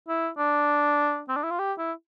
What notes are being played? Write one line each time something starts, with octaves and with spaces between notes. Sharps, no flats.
E4
D4
C4
D4
E4
F4
G4
E4